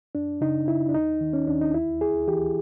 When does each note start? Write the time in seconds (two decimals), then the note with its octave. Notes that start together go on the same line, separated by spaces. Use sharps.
0.15 F#2 D4
0.41 C#3 D#4
0.68 C#3 E4
0.89 D4
0.94 D#2 D#4
1.21 D#3
1.33 C#4
1.48 D#2 D4
1.61 D#4
1.74 D2 E4
2.01 D2 G#4
2.27 E3 G4